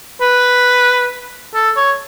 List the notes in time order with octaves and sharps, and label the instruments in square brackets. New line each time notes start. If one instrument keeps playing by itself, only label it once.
[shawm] B4
A4
C#5